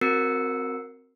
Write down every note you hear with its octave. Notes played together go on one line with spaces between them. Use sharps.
C4 F#4 A#4 E6 C7 C#7